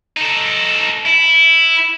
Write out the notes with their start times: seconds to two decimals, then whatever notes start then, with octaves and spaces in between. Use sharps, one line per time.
0.17 D#4 A4
1.05 E4